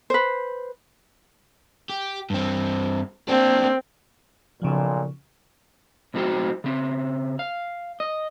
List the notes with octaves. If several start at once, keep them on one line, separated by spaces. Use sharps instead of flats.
B4 C5
G4
G2 C4
A#3 C4 D4
B1 A#2 C#3 F3
B1 A2 C4 D#4 F#4 G5
C#3 C4
F5
D#5